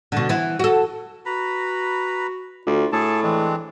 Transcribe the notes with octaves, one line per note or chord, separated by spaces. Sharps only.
B2 D3
E3 B3
F#4 A4
F#4 B4 A#5 B5
D2 F4
A2 G#4 A4 A5
E3 G#3 C4 D4